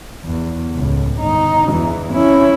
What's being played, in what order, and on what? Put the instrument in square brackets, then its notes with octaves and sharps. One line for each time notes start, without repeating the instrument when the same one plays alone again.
[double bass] E2
C#2 A2
G1 D#4
E2 E3
C#4 E4